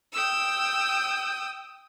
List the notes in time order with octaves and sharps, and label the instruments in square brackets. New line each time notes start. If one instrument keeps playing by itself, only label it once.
[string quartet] G5 D#6 E6